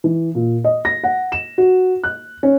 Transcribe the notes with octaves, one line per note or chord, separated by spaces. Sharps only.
E3
A#2
D#5
A#6
F#5
E7
F#4
F#6
C#4